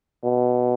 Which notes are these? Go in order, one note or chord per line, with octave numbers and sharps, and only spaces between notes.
B2